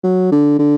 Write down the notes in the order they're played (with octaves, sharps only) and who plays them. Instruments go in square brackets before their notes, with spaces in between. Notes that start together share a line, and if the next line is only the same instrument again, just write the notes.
[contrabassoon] F#3
D3
D3